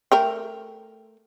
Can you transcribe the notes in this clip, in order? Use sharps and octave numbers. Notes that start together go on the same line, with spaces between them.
A3 A#4 G5